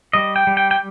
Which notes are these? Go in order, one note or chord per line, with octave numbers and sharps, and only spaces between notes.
G3 D#5
G5
G3
G5
G5